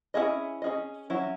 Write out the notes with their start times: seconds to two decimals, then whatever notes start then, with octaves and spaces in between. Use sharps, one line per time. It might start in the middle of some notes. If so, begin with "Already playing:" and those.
0.14 C#4 E4 G#4 D#5
0.62 C#4 G#4 D#5
1.10 F#3 C#4 E4